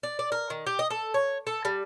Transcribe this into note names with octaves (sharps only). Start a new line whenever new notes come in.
D5
D5
A#4
D#3
G4
D#5
A4
C#5
A4
G3